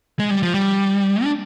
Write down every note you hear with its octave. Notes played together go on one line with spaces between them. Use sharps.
G#3
G3
F3
G3
D4